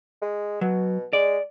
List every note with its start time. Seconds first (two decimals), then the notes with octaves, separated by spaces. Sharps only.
0.22 G#3
0.61 B2 F#3
1.13 G#3 D5